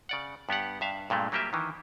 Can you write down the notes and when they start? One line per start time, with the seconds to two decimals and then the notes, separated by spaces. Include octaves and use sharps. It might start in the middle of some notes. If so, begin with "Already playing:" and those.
0.09 C#3 D5 F#5
0.49 G2 B3 G4 F#5
0.81 G2 E5 F5
1.10 G2 A#2 G#3 A3
1.32 F#3 G3 A#3 G4 G#4 E5
1.53 D#3 E3